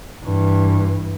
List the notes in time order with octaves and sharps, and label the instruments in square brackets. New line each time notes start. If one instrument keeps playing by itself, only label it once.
[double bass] G2 E3